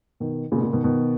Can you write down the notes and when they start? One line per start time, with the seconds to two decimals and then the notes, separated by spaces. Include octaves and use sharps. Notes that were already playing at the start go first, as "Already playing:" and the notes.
0.20 B2 D#3
0.52 A#2 C#3
0.58 B2
0.62 A#2 C#3
0.73 B2 D#3
0.84 B2 D#3